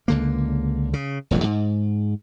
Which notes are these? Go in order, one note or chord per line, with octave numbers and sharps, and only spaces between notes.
C#2 D3 A#3
C#3
E1 A1 F2 F#3
G#2